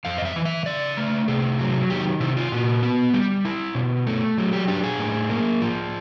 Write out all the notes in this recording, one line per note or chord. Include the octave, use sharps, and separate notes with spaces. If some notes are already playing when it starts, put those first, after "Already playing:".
F2 F5
D#5
E5
E3
E5
C#3 D5
A3
C3 G#4
F#3
D#3 G4
C3 E4
F4
A#2 F#4
B3
G3 G4
E4
B2
A3
F#3
G4
D4 G4
G#4
A2
A#3
F3